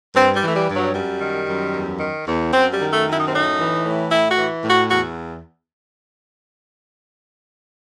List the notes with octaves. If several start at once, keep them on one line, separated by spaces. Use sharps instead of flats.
G2 C4
G3
E3 A3
G3
G2
F#3
F#2 G3
D#3
F#2
E2
D#3
E2
F#2 C4
G3
D#3
A3
F#2
E4
D#4
C4
A2 D#4
E3
A2
A2 E4
F#4
E3
A2
F#4
E2 F#4